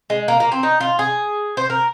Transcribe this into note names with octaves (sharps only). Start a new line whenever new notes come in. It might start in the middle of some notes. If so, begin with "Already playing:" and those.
G#3
A#3
A#3
C4
D#4
F4
G#4
C5
A#4